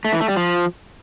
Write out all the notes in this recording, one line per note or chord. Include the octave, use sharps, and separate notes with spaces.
A3
E3
A3
G3
F3